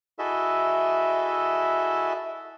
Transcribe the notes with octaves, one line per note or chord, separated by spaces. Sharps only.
E4 F#4 G#4 A4 D#5 E5